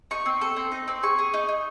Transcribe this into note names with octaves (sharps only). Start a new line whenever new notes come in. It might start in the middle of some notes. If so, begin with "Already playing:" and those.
D#4 C#6
C4
A4
C4
D#4
C4
G#4 C#6
G#4
D#4
D#4